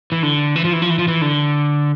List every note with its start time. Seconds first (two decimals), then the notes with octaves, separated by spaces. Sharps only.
0.12 E3
0.23 D3
0.56 E3
0.65 F3
0.73 E3
0.82 F3
0.90 E3
0.99 F3
1.08 E3
1.22 D3